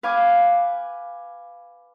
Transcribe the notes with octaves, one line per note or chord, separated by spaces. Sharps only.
B4 F5 G#5 D6